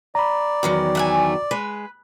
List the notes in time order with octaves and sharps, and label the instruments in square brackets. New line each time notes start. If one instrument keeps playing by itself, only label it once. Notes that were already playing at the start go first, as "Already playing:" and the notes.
[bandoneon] D5 [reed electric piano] A#5 B5
[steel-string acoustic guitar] E2 D#3 F#3
[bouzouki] A3 F#5 G#5
[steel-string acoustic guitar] G#3 [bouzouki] B4